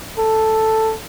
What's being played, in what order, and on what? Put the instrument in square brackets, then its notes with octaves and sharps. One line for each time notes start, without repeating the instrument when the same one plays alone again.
[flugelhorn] A4